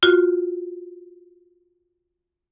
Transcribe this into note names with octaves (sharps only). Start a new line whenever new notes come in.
F4 F#4